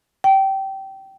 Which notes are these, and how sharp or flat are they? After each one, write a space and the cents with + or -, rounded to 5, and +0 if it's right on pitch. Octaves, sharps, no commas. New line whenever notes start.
G5 -20